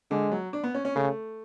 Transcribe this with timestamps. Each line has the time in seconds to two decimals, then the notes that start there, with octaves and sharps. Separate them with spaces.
0.11 D3 G#3
0.32 F#3
0.53 D4
0.64 B3
0.74 C#4
0.85 C#4
0.95 C#3 A3